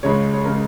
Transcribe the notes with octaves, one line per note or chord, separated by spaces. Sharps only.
C#2 C#3 G#3 C#5
C#5
C#3 G#3 A#4